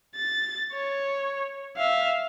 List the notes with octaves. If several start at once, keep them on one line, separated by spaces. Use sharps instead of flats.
A6
C#5
E5 F5